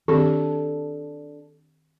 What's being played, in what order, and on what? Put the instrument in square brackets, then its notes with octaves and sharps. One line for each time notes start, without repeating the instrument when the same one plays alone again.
[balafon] D#3 C4 G4 [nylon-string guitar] D4 A4